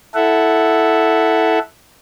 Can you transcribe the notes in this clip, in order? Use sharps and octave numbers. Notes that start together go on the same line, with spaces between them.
E4 A4 E5 F#5